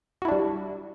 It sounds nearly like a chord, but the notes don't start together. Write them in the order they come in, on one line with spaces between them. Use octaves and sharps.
F#4 E4 D4 G3